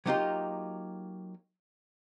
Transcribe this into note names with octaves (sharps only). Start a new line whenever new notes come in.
F#3 A#3 B3 D#4 F4 G4